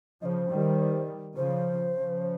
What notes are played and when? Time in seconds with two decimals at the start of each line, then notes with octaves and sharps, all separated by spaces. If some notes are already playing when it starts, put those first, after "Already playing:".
0.22 C#3 F3 C5 D#5
0.50 D#3 G3
1.36 C#3 F3 C5
1.93 C#3 F3